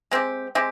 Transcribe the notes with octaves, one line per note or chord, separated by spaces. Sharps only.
G#3 C4 G4
G#3 C4 G4